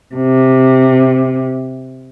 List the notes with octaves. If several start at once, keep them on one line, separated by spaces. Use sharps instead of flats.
C3